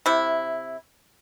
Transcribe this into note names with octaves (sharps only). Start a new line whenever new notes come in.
C3 E4